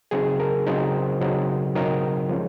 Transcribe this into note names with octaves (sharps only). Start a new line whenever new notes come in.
C#3 F#3 C4 D#4 G#4
A#4
C#3 F#3 C4 D#4 C5
C#3 F#3 C4 D#4
C#3 F#3 C4 D#4 A#4
F3 G#3 C#4